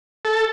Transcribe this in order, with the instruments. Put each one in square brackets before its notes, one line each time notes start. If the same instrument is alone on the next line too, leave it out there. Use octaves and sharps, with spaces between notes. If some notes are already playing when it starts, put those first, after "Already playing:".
[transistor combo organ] A4